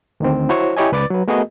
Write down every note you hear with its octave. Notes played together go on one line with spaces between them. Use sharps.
D2 D#3 C4
E4 F#4 C5 C#5
E4 G4 C#5 D#5 G#5
C#2 B4 D5 D6 A6
F#3 B4
A3 B3 F#4 G#4 A#4 D#5